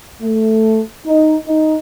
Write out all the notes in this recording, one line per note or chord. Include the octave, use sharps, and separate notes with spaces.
A3
D#4
D#4